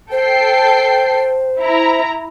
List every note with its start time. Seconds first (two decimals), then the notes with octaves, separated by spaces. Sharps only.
0.12 A4 C5 G5 C7
1.61 E4 A#5